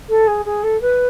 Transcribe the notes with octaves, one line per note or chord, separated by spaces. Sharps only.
A4
G#4
G#4
A4
B4